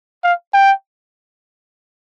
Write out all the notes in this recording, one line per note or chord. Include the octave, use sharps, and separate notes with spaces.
F5
G5